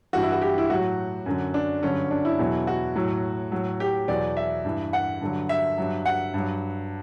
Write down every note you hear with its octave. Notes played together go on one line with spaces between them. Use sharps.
G2 E3 F#4
E4
F#4
G4
E4
A2 F#3 F#4
F#2 D3 F#3
D4
G2 D3 F#3 C#4
D4
E4
E2 B2 F#3
F#4
A2 F#3
A2 F#3
G4
E2 B2 F#3 D5
E5
G2 E3
F#5
G2 D3 F#3
E5
G2 F#3
F#5
G2 F#3